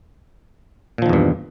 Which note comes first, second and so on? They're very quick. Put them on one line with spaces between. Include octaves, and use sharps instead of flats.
A#2 F3 D#3 E2 G2